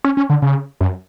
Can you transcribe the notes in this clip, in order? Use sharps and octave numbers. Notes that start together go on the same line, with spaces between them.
C#4
C#4
D3
C#3
F#2